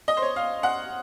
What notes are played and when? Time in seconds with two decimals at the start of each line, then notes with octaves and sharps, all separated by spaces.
0.08 D#5
0.17 C5
0.22 C#5
0.36 F5
0.63 F#5